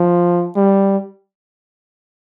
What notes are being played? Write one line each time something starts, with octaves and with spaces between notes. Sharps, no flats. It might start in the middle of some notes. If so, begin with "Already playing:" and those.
Already playing: F3
G3